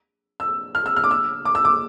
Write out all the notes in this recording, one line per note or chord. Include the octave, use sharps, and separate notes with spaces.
E6
F6
E6
F6
D6
E6
D6
E6
D6